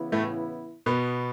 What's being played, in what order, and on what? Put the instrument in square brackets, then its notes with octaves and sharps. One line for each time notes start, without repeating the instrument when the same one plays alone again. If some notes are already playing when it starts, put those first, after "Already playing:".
Already playing: [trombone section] C#3 E3 B3 E4
[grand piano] A2 A3
B2 B3